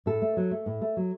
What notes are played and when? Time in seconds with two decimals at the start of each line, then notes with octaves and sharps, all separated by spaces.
0.06 A2 A4
0.22 A3
0.37 F#3
0.51 A3
0.66 A2
0.81 A3
0.97 F#3